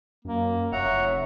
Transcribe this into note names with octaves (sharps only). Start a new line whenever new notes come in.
F#2 A#3
F1 C#5 E5 F#5 A#5